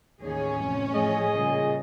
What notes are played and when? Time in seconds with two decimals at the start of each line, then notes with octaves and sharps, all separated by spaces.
0.21 A1 D#2 C#4 G#4
0.61 F2 C3
0.93 A2 F3 A3 G#4 D#5
1.32 A#2 C#3 G3